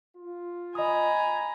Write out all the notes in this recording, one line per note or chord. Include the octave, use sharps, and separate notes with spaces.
F4
D#5 G#5 A#5 B5 D#6